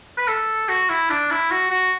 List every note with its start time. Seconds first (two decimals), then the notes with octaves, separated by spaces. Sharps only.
0.18 B4
0.28 A4
0.69 F#4
0.89 E4
1.10 D4
1.30 E4
1.51 F#4
1.71 F#4